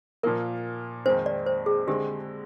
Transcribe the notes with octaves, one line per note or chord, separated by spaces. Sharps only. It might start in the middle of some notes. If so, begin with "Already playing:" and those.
A#2 F3 A#3 A#4
F2 D#3 G#3 C4 C5
D5
C5
G#4
D3 G#3 C4 G4